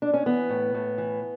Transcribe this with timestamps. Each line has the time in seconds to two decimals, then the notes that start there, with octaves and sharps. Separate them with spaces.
0.02 D4
0.14 C#4
0.26 E3 B3
0.49 A2
0.74 A2
0.98 E3